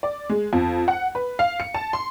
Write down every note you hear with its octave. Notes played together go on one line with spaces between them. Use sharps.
D5
G#3
F2
F#5
B4
F5
C#7
A5
C6